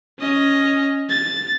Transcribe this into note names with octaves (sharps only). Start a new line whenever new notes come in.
C#4 D#5
A6